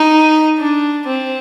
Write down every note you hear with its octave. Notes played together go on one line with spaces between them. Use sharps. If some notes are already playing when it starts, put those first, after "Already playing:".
Already playing: D#4
D4
C4